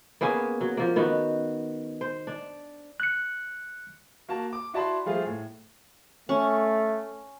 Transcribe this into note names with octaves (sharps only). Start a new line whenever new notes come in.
A#3 B3 C#4 G#4
F#3
F3 A#3
D#3 B3 F#4
C5
D4
F#6 C#7
A#3 F#4 A5
D6
E4 F#4 D5 A5 B5 C6
F3 G3 A3 F4 G#4
A2
A3 C#4